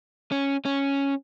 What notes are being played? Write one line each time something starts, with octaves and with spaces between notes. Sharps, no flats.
C#4
C#4